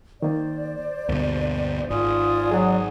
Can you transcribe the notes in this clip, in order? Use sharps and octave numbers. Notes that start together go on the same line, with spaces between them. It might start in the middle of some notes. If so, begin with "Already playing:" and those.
D#3 A#3 C5 D5
D2 G2 B2 A#3
G#1 F4 D5 G#5 D#6
F#3 G#4 F#5